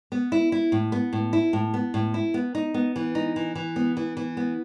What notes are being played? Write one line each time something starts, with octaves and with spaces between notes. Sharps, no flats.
B3
E4
E4
A2
B3
A2
E4
A2
B3
A2
E4
B3
D#4
B3
E3
D#4
E3
E3
B3
E3
E3
B3